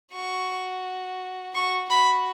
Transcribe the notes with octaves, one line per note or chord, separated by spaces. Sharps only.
F#4 C#6
F#4 C#6
F#4 B5